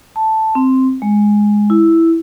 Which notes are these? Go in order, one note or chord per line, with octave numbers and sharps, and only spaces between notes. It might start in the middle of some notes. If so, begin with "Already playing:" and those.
A5
C4
G#3
E4